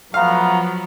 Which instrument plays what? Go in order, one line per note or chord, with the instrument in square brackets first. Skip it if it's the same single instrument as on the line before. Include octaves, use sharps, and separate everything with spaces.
[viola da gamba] F3 F#3 [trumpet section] A3 B3 A#5 [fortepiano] F5